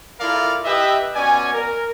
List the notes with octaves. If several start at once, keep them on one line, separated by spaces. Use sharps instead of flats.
E4 F4 A4 A#4 D5 F5
G4 B4 D#5 E5
B2 C#4 D5 G#5
A#4